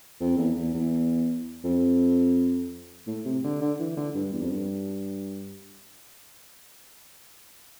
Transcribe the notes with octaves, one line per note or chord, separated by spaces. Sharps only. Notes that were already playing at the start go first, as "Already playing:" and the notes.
F2
E2
E2
E2
F2
A2
C3
D3
D3
E3
D3
G2
E2
F2
G2